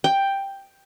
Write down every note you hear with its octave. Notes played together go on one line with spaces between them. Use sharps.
G5